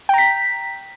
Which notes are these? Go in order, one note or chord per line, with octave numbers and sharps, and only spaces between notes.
G5 A#5 B6